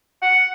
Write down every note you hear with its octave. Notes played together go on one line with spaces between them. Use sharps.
F#5